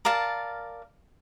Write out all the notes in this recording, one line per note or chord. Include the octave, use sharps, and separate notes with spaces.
A#4 D5 F5 A5